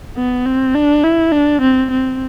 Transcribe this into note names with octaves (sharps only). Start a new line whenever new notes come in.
B3
C4
D4
E4
D4
C4
C4